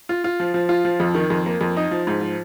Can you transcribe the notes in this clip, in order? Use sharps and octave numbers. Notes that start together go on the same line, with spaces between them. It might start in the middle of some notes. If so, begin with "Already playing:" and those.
F4
F4
F3
F3
F4
F3
F2
D#3
F2
A#3
F2
D#4
F3
G#2
F3